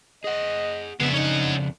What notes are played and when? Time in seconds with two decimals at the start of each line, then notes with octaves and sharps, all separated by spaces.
0.24 G#4 D#5 F#5
1.00 F2 C#3 G#3 B3 D4 E5
1.14 C#4 D#4 F#5